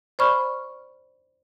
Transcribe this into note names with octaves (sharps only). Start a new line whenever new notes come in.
C5 D5 B5 C#6 F6